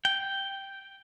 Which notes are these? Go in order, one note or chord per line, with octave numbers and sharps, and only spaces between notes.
G5